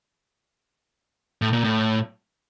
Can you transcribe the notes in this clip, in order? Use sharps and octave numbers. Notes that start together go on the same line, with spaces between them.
A2
A#2
A2